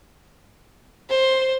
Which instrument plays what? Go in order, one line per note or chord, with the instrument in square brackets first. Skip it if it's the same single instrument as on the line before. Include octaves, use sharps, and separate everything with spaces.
[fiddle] C5